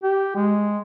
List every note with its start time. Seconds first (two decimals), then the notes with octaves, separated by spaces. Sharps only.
0.03 G4
0.36 G#3